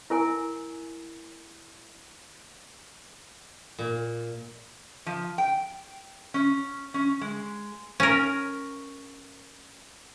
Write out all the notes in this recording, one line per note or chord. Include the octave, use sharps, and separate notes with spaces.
E4 A#4 G#5
A#2
F3
G5
C#4
C#4
G#3
C#4 A#4